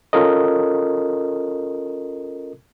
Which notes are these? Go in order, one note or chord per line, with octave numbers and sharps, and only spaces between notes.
C#4 F4 A4 A#4 D#5